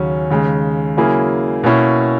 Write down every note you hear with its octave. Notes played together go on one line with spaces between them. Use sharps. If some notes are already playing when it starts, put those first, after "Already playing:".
Already playing: D#2 C#3 F#3 C#4
D#2 C#3 G#3
C#3 F#3 A#3 E4 G#4
B2 A#3 C#4 E4